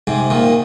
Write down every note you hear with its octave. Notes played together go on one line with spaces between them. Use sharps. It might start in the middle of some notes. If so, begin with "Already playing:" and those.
G#2 C3
A#2 D#3